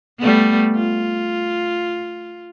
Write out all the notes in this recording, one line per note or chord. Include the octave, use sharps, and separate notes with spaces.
G3 A3 B3
F4